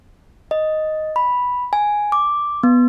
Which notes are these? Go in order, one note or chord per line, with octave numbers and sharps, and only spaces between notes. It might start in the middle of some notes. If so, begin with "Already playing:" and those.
D#5
B5
G#5
D6
B3